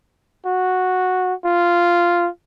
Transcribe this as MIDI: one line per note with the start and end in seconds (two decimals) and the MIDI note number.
0.46 1.34 66
1.45 2.28 65